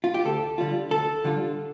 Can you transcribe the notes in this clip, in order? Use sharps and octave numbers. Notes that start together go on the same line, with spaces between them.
F4
G4
D2 A4
D3 G3 F4
D2 A4
D3 G3 F4